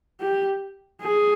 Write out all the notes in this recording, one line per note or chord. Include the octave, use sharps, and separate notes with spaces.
G4
G#4